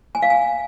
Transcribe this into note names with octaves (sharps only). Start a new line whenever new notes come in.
G#5
F5
G#5